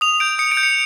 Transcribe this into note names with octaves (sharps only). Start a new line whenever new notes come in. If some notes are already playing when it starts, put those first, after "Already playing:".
D#6 F7
G6 D7
D#6 C#7
D7
G6
C#7